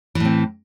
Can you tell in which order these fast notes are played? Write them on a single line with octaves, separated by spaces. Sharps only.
E3 A2 C4